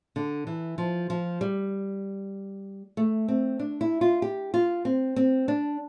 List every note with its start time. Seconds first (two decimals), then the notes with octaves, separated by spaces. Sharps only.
0.16 D3
0.47 E3
0.78 F3
1.10 F3
1.41 G3
2.97 A3
3.28 C4
3.60 D4
3.81 E4
4.01 F4
4.22 G4
4.54 F4
4.85 C4
5.16 C4
5.48 D4